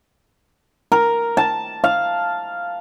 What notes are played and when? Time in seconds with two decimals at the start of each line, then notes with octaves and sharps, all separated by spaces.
0.92 A#4
1.37 A5
1.84 F5